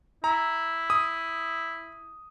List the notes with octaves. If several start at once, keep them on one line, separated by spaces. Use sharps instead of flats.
E4 A#5
D#6